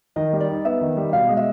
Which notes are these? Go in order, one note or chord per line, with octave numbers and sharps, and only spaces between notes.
D#3 D#5
G3
D5
D#4
B3 E5
D#3
G3
B2 F5
G#3
E5